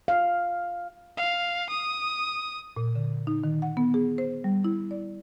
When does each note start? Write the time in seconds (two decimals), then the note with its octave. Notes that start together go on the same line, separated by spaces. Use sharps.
0.08 F5
1.17 F5
1.70 D#6
2.77 A#2
2.95 D3
3.27 D#4
3.44 D#3
3.62 F#5
3.77 B3
3.94 G#4
4.18 C5
4.44 G3
4.64 E4
4.91 D5